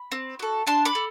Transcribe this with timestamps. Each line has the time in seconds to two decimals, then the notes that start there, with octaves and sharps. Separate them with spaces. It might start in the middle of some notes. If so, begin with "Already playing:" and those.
Already playing: B5
0.12 C4
0.39 F#4 A4
0.67 D4 A5 C6
0.85 B5 D6
0.95 A4